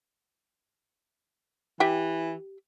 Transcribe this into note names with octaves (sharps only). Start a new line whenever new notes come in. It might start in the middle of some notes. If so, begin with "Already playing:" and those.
E3 G4 E5 G5